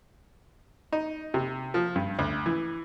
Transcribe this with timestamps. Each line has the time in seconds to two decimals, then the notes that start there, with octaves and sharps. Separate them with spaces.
0.92 D#4
1.34 C3
1.74 F3
1.96 G2
2.19 D2
2.46 E3